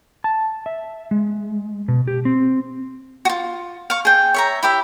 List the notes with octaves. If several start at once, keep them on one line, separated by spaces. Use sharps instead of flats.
A5
E5
G#3
B2
G4
C4
F4 F#4
F5 C#6
G#4 G5
C#5 E5 A#5
E4 G4 E5